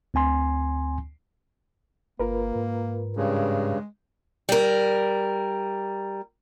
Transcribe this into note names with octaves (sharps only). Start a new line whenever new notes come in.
D2 C4 G#5 C6
G1 A#3 F4 A#4 B4
G#2
G2 C#3 G#3
G3 A#4